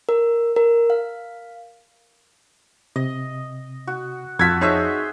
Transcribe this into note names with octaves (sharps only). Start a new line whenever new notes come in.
A#4
A#4
F5
C3 D#5
F#4
F2 F4 F#4 A4 G#6 B6
D#4 G#4 C5 C#5 E5